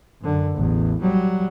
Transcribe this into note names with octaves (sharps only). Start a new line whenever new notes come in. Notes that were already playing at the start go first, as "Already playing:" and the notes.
F#2 D3
A1 E2
F#3 G3